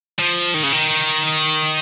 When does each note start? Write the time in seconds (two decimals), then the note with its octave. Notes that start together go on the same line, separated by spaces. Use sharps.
0.19 F3
0.54 D#3
0.63 C#3
0.73 D#3